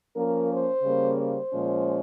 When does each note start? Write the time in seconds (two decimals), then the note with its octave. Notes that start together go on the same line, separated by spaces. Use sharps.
0.15 F3 A#3 C#4 A#4
0.50 C5
0.83 C#3 G3 A#3
1.18 C5
1.52 A#2 F3 G#3 C#4